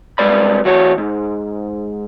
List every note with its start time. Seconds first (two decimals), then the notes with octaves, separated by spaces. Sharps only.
0.18 C2 G#3 B4 D5 B5
0.65 E3 F#4 C#5
0.98 G#2